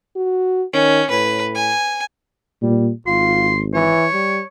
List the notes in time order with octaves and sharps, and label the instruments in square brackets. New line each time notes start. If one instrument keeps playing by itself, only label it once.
[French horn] F#4
[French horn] D#3 [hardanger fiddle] C#4
[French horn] A2 [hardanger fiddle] B4
[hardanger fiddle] G#5
[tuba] A#2 [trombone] G3
[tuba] G#1 [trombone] F4 [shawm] C6
[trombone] E3 [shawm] C#5
[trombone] G3